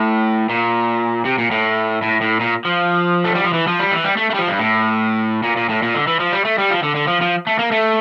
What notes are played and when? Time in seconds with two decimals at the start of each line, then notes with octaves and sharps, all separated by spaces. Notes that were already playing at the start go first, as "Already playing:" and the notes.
Already playing: A2
0.49 A#2
1.25 C3
1.38 A#2
1.51 A2
2.02 A2
2.21 A2
2.40 A#2
2.65 F3
3.24 A3
3.34 G3
3.44 F3
3.53 E3
3.67 F3
3.79 G3
3.92 E3
4.04 G3
4.17 A3
4.30 A3
4.35 G3
4.39 F3
4.48 G2
4.59 A2
5.43 A#2
5.57 A#2
5.69 A2
5.82 A#2
5.95 D3
6.07 E3
6.20 F3
6.32 G3
6.45 A3
6.58 G3
6.70 F3
6.83 D3
6.96 D3
7.08 F3
7.22 F3
7.47 A3
7.59 A#3
7.71 A3